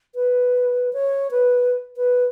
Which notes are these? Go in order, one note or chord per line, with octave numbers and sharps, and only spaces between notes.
B4
C#5
B4
B4